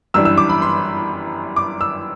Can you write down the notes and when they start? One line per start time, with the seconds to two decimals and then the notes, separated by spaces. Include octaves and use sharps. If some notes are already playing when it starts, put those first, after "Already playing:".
0.14 G1 F#2 E3 G3 D4 E6
0.25 E6
0.38 D6
0.49 B5
0.62 C6
1.56 D6
1.81 E6